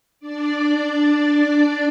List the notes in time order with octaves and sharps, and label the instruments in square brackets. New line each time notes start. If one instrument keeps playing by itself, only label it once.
[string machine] D4 D5